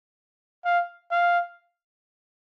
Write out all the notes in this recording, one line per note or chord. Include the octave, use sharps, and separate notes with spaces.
F5
F5